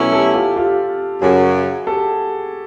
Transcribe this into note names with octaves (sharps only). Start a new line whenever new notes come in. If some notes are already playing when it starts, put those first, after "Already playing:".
Already playing: B2 F#3 A3 C#4 E4
G4 A4
F4 G4
F4 G4
F#2 C#3 F#3 F#4 G#4
G4 A4